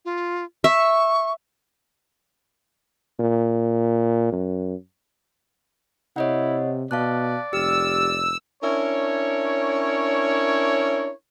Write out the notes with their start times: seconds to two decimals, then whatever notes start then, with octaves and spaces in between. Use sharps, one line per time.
0.05 F4
0.64 E5 C#6
3.19 A#2
4.32 F#2
6.16 C3 E4 C#5 D#5 F#5
6.91 B2 D5 F5 A5 F#6
7.53 F1 G4 E6 F6
8.63 C#4 D4 E4 A#4 C#5